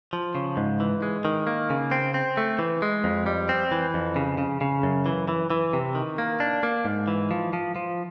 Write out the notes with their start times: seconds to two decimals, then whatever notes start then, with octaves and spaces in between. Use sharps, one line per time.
0.13 F3
0.35 C#3
0.57 G#2
0.80 E3
1.02 G#3
1.25 D#3
1.47 A#3
1.70 C#3
1.91 C4
2.14 C4
2.37 A3
2.59 E3
2.82 G#3
3.04 F2
3.26 G3
3.49 C4
3.72 E3
3.94 F2
4.16 C#3
4.38 C#3
4.61 C#3
4.83 F#2
5.06 E3
5.28 E3
5.50 E3
5.73 C3
5.95 D#3
6.18 A#3
6.40 D4
6.63 A#3
6.85 G#2
7.08 E3
7.31 F3
7.53 F3
7.76 F3